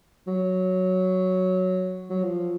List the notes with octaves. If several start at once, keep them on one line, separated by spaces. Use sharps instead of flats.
F#3
F#3
F3